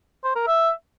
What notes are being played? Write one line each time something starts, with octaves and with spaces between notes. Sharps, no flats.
C5
A#4
E5